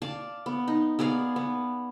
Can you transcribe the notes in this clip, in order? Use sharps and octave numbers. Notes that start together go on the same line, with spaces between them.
D5 F5 A5
B3
D#4
B3 G#4 D5 F5
B3